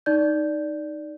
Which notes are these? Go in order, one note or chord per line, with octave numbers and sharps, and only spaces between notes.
D#4 D5 G6